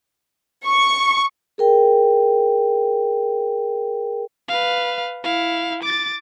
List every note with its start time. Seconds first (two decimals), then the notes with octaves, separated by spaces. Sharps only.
0.65 C#6
1.58 G#4 A#4 G5
4.49 B4 F5
5.24 E4 F5
5.83 D6 A6